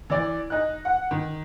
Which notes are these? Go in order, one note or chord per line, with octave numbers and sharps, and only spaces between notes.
E3 D5
D#4 F#6
F#5
D#3